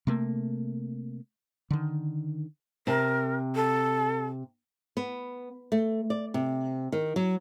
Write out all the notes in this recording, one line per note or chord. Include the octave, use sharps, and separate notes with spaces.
C3 A3 A#3
D3 D#3
C3 A#4 A5
A4
B3
A3
D5
C3
D#3
F#3